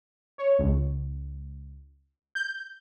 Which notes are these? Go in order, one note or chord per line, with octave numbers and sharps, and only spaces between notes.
C#5
C#2
G6